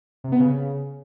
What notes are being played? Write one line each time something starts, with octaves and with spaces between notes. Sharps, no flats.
C3
B3
C#3